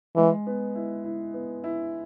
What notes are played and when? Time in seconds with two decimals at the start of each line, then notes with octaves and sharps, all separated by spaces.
0.16 E3 G#3
0.47 B3
0.75 E4
1.04 E4
1.34 B3
1.64 E4